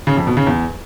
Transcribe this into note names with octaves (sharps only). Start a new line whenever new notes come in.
C#3
F2
B2
C#3
E2